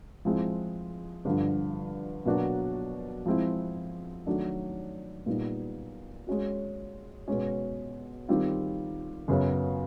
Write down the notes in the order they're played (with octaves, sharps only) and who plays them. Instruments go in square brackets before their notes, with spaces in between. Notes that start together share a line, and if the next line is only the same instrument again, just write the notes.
[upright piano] F3 G#3 C4 E4
G2 D3 F3
B2 F#3 A#3 D4 F#4
F3 G#3 C4 E4
D#3 F#3 A3 D4
A#2 G3 B3 D#4
G#3 C#4 F#4
B2 G#3 C#4
D#3 G3 C4 F4
F#2 C#3 F#3 B3